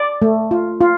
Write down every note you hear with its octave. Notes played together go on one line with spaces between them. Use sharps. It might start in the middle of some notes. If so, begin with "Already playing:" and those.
Already playing: D5
A3
F4
F4